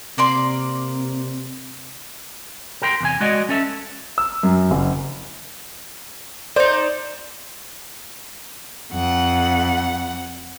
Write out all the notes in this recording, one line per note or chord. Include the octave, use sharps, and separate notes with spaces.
C3 A#3 D5 C6
G4 A#4 G5 C6
E2 C3 G#5
G#3 F#4 D5 D#5
C#4 A4 E5
E6
F#2
F#1
D#4 C5 D5
F2 F#5